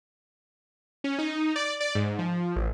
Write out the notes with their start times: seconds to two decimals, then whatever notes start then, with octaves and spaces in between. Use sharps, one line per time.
1.04 C#4
1.18 D#4
1.56 D5
1.80 D5
1.95 G#2
2.19 F3
2.56 A1